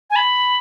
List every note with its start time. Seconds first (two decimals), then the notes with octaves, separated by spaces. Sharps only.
0.10 G#5
0.16 B5